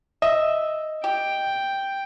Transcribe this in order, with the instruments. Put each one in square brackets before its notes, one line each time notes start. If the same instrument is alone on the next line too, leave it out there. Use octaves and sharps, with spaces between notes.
[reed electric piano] D#5 [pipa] E5
[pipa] G4 [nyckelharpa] G5